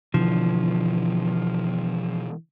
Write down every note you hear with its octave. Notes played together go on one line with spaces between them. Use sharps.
B2 D3 E3 F3